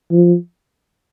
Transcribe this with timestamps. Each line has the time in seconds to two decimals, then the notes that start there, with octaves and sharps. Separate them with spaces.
0.12 F3